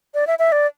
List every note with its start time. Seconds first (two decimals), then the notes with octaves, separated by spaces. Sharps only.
0.14 D5
0.27 E5
0.39 E5
0.52 D5